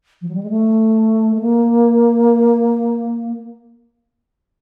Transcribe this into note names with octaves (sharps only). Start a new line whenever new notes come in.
F3
F#3
G3
G#3
A3
A3
A#3